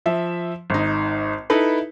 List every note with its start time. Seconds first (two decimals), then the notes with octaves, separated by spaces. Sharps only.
0.06 F3 E5
0.70 G#1 D#4
1.50 D#4 E4 A4 B4